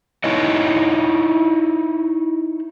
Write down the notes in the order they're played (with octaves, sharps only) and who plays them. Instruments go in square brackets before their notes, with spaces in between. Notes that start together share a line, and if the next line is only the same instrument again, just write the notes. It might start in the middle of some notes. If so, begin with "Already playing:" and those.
[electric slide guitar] D#4 E4 C#5 D#5